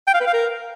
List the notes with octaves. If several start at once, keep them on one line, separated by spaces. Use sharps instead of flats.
G5
F5
B4
F5
A#4